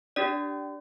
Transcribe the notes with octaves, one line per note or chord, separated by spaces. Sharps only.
D4 G4 D5